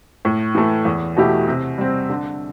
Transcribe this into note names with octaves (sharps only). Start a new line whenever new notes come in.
A2
E3 A3
E2
B2 A3 E4 G4
C3
G3 C4
D3